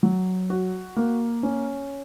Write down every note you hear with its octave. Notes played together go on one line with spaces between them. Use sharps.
F#3
F#4
A#3
C#4